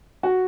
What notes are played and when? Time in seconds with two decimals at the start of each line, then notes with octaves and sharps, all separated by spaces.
0.23 F#4